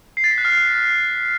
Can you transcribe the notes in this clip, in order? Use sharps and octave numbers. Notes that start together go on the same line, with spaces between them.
C7
A6
B6
F#6
F6